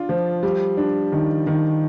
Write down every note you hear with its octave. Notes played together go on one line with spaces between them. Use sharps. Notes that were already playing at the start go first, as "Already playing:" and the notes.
Already playing: D4 F4
F3
G3
D4
D#3
D#3